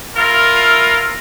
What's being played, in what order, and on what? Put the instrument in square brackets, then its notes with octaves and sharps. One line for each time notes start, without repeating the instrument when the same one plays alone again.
[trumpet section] E4 F4 A#4